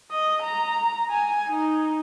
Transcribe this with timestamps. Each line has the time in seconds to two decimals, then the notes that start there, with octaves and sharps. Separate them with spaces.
0.11 D#5
0.43 A#5
1.11 G#5
1.48 D#4